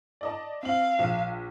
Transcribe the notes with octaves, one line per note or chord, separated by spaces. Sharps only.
D5 D#5 A5
C4 F5 F#7
A#1 E7